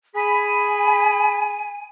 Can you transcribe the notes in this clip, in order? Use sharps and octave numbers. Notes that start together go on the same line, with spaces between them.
G#4 G#5 B5